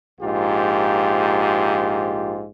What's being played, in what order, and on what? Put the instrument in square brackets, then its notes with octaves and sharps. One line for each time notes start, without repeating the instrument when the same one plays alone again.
[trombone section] A#1 G#2 F4 G4